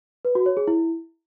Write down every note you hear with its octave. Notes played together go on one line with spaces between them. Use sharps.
B4
F#4
C#5
G#4
E4